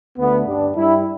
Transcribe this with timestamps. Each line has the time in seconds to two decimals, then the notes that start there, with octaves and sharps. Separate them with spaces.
0.18 D2 D3 A3 B3
0.46 G2 G3 D4
0.75 G2 G3 E4